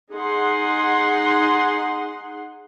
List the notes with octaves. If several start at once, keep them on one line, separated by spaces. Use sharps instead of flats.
D#4 G#4 F#5 C6